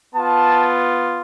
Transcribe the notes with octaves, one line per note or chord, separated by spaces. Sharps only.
B3 F4 A5